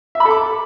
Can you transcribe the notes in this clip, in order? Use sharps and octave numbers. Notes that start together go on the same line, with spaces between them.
E5
B5
A4
D6